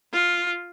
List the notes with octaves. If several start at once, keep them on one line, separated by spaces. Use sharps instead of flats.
F4